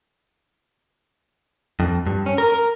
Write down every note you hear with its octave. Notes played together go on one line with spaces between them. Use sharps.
F2
G2
C#4
A#4
A#4